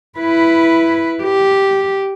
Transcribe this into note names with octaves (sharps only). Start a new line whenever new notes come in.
E4 B4
G4